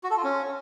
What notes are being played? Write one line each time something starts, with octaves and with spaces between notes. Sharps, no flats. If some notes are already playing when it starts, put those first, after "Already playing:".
F#4
A4
F4
C#4